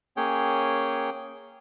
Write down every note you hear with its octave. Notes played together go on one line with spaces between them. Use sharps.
A#3 C#4 G#4 C#5 G5